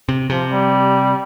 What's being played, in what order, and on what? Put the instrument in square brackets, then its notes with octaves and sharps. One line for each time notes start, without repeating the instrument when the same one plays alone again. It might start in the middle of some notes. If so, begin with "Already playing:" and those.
[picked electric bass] C3
[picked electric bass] C3 [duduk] F3
[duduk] G3